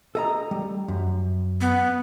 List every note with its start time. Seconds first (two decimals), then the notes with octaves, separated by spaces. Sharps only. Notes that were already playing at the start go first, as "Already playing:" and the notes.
0.15 A4 D#5 A#5
0.51 G3
0.88 F#2
1.61 B3